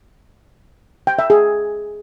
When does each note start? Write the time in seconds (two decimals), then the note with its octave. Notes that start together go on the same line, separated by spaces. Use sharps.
1.07 G5
1.19 E5
1.30 G#4